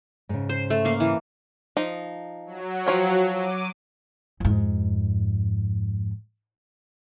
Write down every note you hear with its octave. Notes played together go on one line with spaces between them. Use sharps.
G#2 C#3
C5
A3
A#3 F5
E3
F3 D#4
F#3
F3 C#5 G5
D6 D#7
F2 G#2